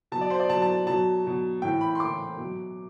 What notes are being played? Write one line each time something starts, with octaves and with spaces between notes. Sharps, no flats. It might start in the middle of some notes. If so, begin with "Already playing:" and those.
B2 F#3 A5
D5
C5
D5
B2 F#3 A5
A5
B2 F#3 A5
B2 F#3
A2 E3 G5
B5
C6
A2 E3 D6
B2 F#3